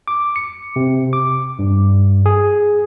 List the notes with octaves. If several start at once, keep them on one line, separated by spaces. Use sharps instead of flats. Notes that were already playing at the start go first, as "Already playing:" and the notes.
D6
C#7
C3
D6
G2
G#4